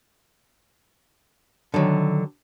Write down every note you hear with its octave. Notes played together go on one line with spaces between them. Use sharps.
D3 D#3 F#3